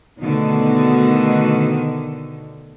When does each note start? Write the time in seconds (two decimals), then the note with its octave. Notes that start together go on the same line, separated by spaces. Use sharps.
0.20 D2 B2 D3 D#3